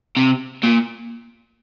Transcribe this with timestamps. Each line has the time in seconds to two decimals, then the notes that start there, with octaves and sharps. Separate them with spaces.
0.17 C3
0.63 A#2